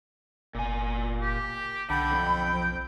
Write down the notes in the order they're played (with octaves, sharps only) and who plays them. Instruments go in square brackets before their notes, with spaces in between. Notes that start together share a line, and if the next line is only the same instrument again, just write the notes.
[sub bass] F#1 [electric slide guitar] A#2 G#5
[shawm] G4
[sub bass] B1 [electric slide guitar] D3 [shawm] G5 [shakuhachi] B5
[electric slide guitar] F2